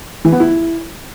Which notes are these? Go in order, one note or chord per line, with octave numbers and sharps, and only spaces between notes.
E3
B3
E4